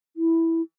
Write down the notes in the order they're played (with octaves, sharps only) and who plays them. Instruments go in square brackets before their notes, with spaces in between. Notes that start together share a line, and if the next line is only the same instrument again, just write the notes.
[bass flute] E4